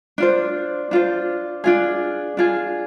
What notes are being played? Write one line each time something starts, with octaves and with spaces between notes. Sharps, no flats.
D4 F4 C5
D4 F4 C5
D4 F4 G#4
D4 F4 G#4